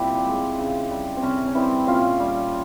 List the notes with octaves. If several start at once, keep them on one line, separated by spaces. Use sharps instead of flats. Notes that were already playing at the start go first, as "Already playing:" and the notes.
Already playing: A#2 G3 C4 E4 G4
G#3
C#3
G3
C4
C3 C#4
C#4
E3 G3 C4 E4
A#2 C#4 F4
G3